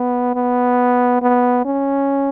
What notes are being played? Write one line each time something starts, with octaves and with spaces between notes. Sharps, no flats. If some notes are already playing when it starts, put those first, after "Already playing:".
Already playing: B3
B3
B3
C#4